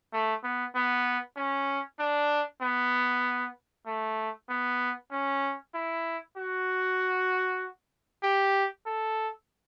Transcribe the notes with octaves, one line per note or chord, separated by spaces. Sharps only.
A3
B3
B3
C#4
D4
B3
A3
B3
C#4
E4
F#4
G4
A4